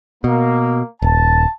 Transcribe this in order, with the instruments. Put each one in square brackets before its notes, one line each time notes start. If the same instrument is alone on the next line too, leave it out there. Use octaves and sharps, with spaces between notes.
[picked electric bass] B2 [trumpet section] A#3
[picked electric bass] D#1 [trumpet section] A5